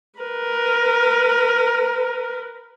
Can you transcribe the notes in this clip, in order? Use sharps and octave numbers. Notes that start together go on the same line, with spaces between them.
A#4 B4